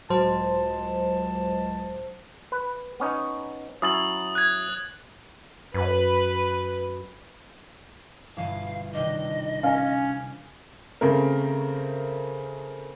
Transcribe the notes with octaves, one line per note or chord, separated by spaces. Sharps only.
C#2 A2 F#3 G#3 C5 A5
B4
B3 C#4 D#4
F#3 C#4 E4 D#6 A6 F#7
F#6 G#6
F#2 B4
G1 B2 E3 F5
C3 D#3 D4 D#5
C#4 F5 G#5
C#3 A3 C4 A#4